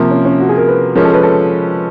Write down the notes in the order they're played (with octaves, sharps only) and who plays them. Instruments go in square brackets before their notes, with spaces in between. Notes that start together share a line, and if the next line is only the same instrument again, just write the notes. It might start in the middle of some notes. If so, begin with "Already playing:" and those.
Already playing: [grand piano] C3 F3 A#3
[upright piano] C#4
C#4
F#4
G#4
A#4
B4
[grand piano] F3 G#3 C#4 [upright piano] A#4
[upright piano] A4
B4
A4